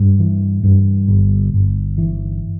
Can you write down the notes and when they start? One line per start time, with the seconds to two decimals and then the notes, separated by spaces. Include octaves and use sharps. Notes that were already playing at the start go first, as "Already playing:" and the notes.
Already playing: G2
0.19 E3
0.64 G2
1.08 G1
1.54 G1
1.98 E3